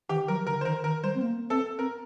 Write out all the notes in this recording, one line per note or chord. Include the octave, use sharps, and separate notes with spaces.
D#3 G4
F#3 A#4
D3 A#4
C5
D#3 A#4
D#3 A#4
G3 C5
C4
A#3
C4 A4
C4 A#4